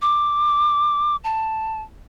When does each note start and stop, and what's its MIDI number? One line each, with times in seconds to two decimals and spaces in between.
0.02 1.16 86
1.24 1.82 81